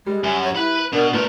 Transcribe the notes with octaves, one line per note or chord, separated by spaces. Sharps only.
G3 G#3
F#2 G#5
C#5
E4 B4 B5
B2 D4 A#4
A#2 A3 A#4 B4